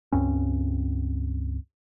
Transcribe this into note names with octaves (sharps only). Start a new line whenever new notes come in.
C#2 G2 C4 C#4